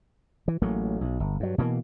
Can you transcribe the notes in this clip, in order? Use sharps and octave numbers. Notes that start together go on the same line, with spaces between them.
E3
A1 F#3 A3 A#3
B1
G1
G2 F#3
B2 E3 G3 A#3